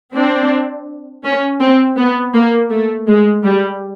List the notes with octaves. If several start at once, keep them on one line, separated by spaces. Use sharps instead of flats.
C4 D4
C#4
C4
B3
A#3
A3
G#3
G3